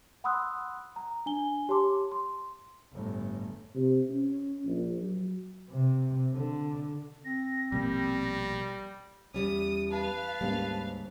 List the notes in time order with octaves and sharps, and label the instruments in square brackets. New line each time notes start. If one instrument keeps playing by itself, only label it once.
[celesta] F#5 B5 C6 D#6 E6 F#6
A#5
D4 G#5 G7
G4 C#5 A5 C6 D6
C6
[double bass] G1 A2
[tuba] C3
C#4
A#1
F#3
[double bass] C3
D3
[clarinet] C4 [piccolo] A#6
[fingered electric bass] A#1 B2 A#3 [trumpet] G3 [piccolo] A#6
[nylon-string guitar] E2 G3 C#4 [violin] D#6
[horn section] B4 A5 [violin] F5
[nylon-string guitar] D2 G#2 [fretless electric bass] G3 A#3 C#4